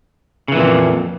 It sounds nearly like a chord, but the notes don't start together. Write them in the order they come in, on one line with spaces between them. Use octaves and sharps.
C#3 E3 A#2 F2